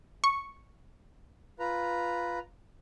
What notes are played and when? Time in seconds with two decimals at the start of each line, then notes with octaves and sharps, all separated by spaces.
0.24 C#6
1.59 F4 B4 A#5